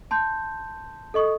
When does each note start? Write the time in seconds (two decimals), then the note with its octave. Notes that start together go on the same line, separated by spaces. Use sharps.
0.11 A5 C6 G6
1.14 A4 D#5 C#6 D#6